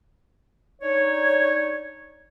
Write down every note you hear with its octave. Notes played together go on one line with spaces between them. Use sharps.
D4 D#4 C#5